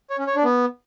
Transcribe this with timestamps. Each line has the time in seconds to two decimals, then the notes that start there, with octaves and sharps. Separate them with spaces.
0.10 C#5
0.19 C#4
0.27 C#5
0.36 D4
0.44 B3